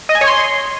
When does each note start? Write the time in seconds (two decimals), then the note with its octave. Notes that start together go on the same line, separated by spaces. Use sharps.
0.09 D#5
0.15 G#5
0.21 C#5
0.27 C6